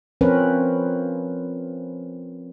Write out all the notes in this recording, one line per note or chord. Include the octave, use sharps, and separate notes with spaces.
F3 C4 C#4 A#4 B4